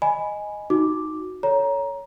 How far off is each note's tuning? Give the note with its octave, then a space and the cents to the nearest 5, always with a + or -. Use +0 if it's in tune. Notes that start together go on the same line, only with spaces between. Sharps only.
D#5 +0 G#5 +0 B5 +0
D#4 +0 F#4 -10 D6 +0
A4 +20 C#5 +15 A#5 +15